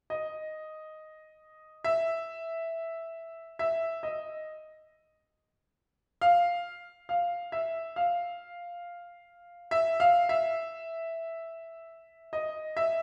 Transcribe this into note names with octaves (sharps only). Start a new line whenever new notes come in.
D#5
E5
E5
D#5
F5
F5
E5
F5
E5
F5
E5
D#5
E5